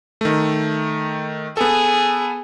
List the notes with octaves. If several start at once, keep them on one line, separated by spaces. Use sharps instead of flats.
D#3 A3
B3 G#4 A4